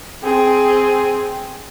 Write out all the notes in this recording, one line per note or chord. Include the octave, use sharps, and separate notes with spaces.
C4 G#4